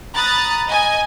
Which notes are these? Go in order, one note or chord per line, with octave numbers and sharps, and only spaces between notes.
A#5 B5 D#6 F#6 A6
D#5 G#5